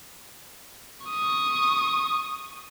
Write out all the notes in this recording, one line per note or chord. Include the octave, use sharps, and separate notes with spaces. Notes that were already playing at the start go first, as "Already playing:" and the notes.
C#6 D#6